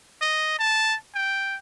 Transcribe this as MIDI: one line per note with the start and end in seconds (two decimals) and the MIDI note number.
0.21 0.54 75
0.59 0.96 81
1.15 1.56 79